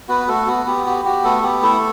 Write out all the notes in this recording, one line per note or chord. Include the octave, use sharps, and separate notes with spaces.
B3 F#4 B4
A3 F#4 A4
B3 F#4
B3 G4
F#4 G4
F#4 G4
A3 B3 A4
B3 G4
A3 E4 A4